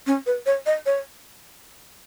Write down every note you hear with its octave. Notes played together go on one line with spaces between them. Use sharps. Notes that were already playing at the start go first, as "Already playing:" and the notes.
C#4
B4
C#5
D#5
C#5